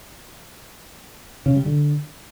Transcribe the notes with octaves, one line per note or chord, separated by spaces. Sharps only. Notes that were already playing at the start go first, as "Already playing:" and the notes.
C#3
G3
D3